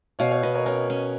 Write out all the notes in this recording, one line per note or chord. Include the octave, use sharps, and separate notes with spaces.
B2 C#5 F5
C#5 F5
B2 B4 D#5
A#4 C#5
C#4 A#4 C#5
C#4